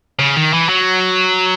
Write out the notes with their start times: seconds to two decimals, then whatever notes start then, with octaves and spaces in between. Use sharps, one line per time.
0.19 C#3
0.36 D#3
0.53 E3
0.69 F#3